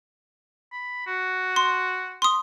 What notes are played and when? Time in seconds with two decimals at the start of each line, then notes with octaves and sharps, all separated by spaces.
0.72 B5
1.07 F#4
1.56 C6
2.22 C6 D#6